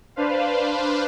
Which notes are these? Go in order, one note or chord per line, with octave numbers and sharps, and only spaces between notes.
D4 B4 C5 F5